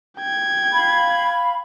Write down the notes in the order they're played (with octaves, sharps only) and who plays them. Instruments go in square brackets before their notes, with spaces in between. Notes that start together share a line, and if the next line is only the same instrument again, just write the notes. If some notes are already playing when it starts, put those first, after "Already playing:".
[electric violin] G5 G#6
[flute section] F5 B5